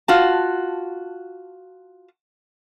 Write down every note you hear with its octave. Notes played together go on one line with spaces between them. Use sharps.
F4 F#4 A5